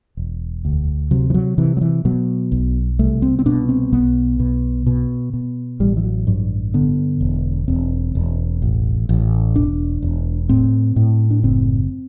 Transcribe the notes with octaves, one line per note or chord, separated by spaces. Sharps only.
E1
D2
C3 F#3
E3
F#3
C3 E3
F#3
E3
B2 F#3
B1
C2 A3
C4
C4
B2 D4
C4
B1 B3
B2
B2
B2
A1 G3
E3
F#3
G2 F#3
D3 B3
E1
E1 C4
E1
A1
A1
E1 D4
E1
A2 C4
A2
D4
F#1 C4